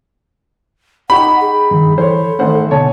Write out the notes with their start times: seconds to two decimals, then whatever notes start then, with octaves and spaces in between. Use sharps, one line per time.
1.10 D#4 G4 F#5 B5 C#6
1.41 G#4
1.71 G2 D#3
1.98 E3 A4 C5 C#5
2.39 G#1 A3 C5 F#5
2.71 B2 D3 C#5 G#5 A5